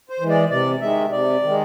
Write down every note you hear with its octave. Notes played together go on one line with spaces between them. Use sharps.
C5
E3 G#3
D5
C3 D5
D#3 G#3 E5
C3 D5
D#3 G#3